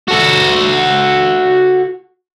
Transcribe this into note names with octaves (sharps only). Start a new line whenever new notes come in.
F#4 A4